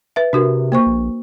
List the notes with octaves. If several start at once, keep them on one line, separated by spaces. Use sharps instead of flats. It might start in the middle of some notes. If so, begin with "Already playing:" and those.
B4 E5
C3 D4 F#4 A#4
A#3 C5 C#6
A#1